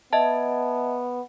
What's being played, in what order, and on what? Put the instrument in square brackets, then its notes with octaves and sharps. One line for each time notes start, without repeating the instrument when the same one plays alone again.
[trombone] B3 [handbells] D#5 E5 A5